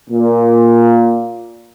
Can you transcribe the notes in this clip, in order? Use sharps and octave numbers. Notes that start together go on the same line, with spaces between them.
A#2